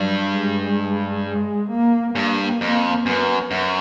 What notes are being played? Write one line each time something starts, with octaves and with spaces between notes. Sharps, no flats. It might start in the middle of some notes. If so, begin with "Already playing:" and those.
Already playing: G2 F#3
G#3
G#3
A#3
G2 A#3
F2
F#2 B3
F#2